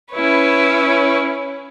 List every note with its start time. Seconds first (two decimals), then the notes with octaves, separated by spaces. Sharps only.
0.13 C#4 E4 B4 C#5